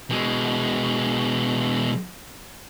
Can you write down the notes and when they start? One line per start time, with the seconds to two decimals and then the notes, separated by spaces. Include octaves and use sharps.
0.10 B2 G#3